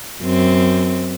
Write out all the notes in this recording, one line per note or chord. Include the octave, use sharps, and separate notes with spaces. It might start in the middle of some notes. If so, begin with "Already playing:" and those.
F#2 C4